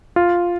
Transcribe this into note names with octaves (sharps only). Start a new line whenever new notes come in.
F4